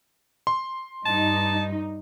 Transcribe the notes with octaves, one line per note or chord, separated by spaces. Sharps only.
C6
G2 D#4 A5